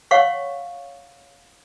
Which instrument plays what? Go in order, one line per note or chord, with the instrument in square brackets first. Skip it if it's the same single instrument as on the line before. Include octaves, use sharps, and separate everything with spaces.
[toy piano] C#5 F5 F#5 C#6